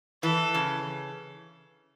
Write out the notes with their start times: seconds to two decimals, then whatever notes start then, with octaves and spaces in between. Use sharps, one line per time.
0.23 E3 A4
0.55 C#3